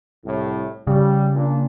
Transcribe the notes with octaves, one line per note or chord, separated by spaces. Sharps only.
C2 A2
C#3 G3
A#2 D4